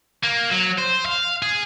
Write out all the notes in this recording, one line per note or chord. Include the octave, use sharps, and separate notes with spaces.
A#3
F#3
C5
F5
G#4